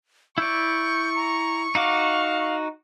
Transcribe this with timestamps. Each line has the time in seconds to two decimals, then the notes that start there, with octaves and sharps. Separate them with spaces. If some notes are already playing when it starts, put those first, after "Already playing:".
0.38 E4 D5 C#6 G6
1.16 A#5
1.75 D#4 F#4 F5 D6